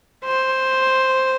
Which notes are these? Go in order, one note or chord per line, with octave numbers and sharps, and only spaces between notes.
C5